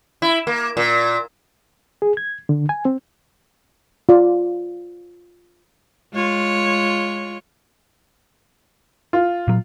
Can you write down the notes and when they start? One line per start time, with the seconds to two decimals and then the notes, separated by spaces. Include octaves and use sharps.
0.22 E4
0.47 A#3
0.77 A#2
2.02 G#4
2.17 G#6
2.49 D3
2.69 G#5
2.85 C4
4.09 F4 D5
6.13 G#3 F4 C#5
9.13 F4
9.48 A#2 F#3